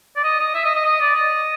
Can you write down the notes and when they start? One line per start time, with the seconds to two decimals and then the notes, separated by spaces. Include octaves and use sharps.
0.16 D5
0.24 D#5
0.39 D#5
0.55 E5
0.64 D#5
0.75 D#5
0.85 D#5
1.01 D5
1.15 D#5